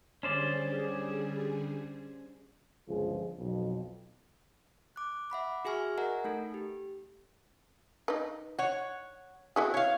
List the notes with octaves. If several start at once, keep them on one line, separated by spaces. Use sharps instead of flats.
D3 G3 C#4 G#4 C5 D5
G1 C#2 F3 G#4
B1 F2
D6 F#6
E5 F#5 B5 D6
F#4 G#4 E5 G#5 C#6 F6
A#4 D#5 F#5 G#5 A#5
A3 D#4 A4
G4
D#4 B4
C#5 F#5
B3 E4 F#4 G#4
C#5 F5